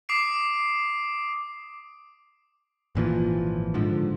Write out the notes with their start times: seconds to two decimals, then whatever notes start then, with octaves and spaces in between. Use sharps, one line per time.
0.09 D6 D#6 C7 D7
2.95 G#1 A#2 E3 F3
3.74 G#2 D3 F3